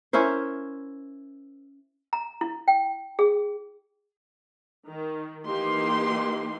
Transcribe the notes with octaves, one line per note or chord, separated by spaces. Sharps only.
C#4 E4 A#4 C5
A#5
E4
G5
G#4
D#3
E3 A#3 D#4 G4 C6